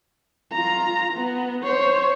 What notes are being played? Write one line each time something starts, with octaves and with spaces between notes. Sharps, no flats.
F4 A#5
B3
C5 C#5